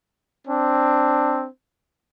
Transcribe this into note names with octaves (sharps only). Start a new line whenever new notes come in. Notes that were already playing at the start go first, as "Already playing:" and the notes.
C4 D4